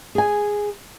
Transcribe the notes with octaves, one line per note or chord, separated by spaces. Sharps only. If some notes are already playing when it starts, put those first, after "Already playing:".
G#4 G#5